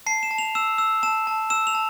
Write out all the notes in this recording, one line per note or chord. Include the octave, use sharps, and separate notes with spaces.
A5 C7
E7
A5
F7
E6 E7
E6
A5 E7
A5
E6 E7
F7
A5